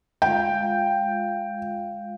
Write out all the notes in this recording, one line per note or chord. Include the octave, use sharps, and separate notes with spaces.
G#3 F4 F5 G5